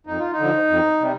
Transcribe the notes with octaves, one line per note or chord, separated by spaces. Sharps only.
F2 D#4
F4
D#4
D3 F3
F2
C3 G3